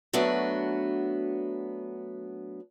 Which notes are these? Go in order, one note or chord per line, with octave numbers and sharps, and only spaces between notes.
F#3 A3 B3 D4 F#4